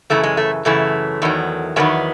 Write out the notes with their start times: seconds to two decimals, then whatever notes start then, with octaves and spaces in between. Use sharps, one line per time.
0.10 F#2 C#3 E3 A3
0.23 G#3
0.37 A3
0.65 F#2 C#3 E3 A3
1.22 E2 D#3 F#3
1.76 E2 D#3 F#3 G#3 B3